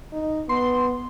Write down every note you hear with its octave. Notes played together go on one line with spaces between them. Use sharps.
D#4
B3 C6